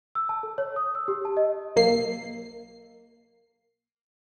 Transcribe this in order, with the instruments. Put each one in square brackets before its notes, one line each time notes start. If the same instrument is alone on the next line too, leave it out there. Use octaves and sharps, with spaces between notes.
[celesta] E6
A5
A4
C#5
D#6
E6
G4
A5
D#5
[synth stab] B1 A#3 C7